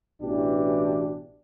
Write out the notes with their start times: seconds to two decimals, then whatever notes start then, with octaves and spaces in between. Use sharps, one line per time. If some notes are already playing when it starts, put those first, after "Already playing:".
0.22 A1 B2 E3 D4 G4